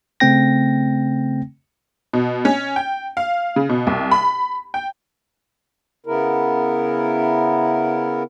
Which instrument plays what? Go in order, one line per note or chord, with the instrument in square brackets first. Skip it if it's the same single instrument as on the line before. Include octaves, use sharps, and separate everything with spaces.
[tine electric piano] C#3 A3 C4 G5 A#6
[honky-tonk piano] B2
C#4
G5
F5
C#3
B2
C2
B5
G5
[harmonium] C#3 B3 E4 A#4